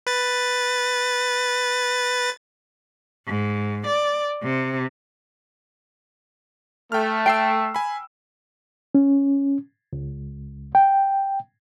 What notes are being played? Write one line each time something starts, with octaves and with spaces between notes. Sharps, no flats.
B4 A6
G#2
D5
C3
A3 G5 F6
G5 E6 C7 D7
G#5 B5
C#4
C#2
G5